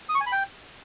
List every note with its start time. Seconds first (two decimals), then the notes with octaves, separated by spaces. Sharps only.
0.09 D#6
0.15 C#6
0.21 G#5
0.26 B5
0.32 G5